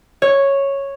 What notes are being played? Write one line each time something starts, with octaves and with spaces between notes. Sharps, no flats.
C#5